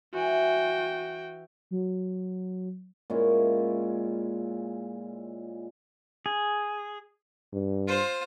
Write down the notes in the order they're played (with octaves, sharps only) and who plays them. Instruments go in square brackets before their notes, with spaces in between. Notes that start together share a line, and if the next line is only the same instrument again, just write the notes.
[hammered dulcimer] E3 [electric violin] F#4 G5
[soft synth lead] F#3
[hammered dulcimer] A#2 G#3 C#4 E4
[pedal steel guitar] G#4
[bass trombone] G2
[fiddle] F4 C5